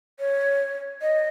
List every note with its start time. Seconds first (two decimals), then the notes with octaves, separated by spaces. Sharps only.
0.20 C#5
1.02 D#5